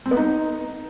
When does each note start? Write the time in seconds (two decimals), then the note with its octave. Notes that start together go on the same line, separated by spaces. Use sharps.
0.06 C4
0.11 B3
0.17 D#4